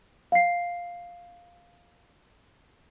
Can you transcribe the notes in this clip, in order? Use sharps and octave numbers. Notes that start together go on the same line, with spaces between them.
F5 C7